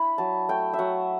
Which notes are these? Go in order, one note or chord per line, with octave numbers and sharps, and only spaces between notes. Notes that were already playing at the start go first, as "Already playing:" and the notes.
Already playing: D4 E4 B5
F#3 A5
A3 G5
E5
F#3 F#5